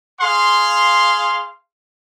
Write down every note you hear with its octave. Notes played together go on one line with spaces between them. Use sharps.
G#4 F5 C6